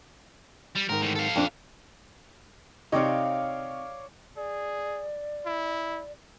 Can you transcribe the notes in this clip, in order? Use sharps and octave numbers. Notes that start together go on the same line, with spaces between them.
G3
G#2 D#3 A#4
A2 E3
A4 F5
F2 D4
C3 D#4 C#5 D5 F5
G#4 D5
E4